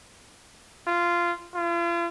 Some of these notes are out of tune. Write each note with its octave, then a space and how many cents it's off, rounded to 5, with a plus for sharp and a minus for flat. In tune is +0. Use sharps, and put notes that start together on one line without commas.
F4 -15
F4 -40